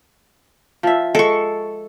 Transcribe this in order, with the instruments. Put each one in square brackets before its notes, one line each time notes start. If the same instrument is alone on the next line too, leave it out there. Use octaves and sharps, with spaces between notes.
[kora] F3 E5
[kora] G#3 [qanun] A4 C#6